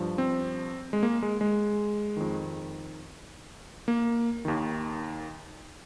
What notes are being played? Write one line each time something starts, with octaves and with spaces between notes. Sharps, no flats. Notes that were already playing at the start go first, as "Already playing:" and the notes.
Already playing: G2 F3
C4
G#3
A#3
G#3
G#3
F2 D#3
A#3
D#2 D#3